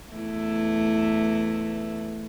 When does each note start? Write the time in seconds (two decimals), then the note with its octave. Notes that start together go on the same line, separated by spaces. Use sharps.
0.12 E2 A3 E4